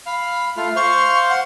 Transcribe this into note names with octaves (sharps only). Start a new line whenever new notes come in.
F5 B5
A3 F4 F5
C5 F5 C6 C#6
F#5